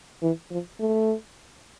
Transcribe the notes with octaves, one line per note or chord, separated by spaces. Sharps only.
E3
F3
A3